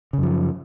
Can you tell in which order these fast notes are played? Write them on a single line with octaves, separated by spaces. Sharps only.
C#3 F#2 F3